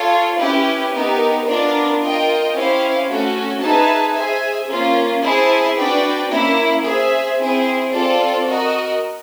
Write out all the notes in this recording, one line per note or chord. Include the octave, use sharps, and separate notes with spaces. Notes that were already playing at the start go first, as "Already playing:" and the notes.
Already playing: F4 A4 C#5
C#4 E4 G4 B4
B3 D#4 G4 A#4
B3 D4 F4 A#4 D5
F4 A#4 D#5 G5
C#4 E4 G4 C5 F5
A3 C#4 F#4 A4
D#4 G#4 B4 E5 A5
G#4 C5 E5 G#5
A#3 C#4 F4
E4 G#4 C5 E5 A5
D4 F#4 B4 D5 G5
A#3 C#4 E4
G#4 C5 E5
C4 E4 G#4 C5
C4 F4 A4 D5
F#4 A#4 D#5